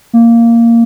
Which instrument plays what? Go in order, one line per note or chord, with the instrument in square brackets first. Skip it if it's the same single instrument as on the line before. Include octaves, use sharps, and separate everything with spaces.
[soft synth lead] A#3